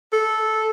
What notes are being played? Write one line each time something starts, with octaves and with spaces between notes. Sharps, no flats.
A4